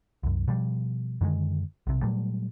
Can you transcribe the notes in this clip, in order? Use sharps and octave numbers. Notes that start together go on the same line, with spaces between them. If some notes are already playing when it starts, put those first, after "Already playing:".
C2 F#2
B2 F3 G3
F#2 D3 D#3 G#3
B1 C3
A#2 F#3 G3 A3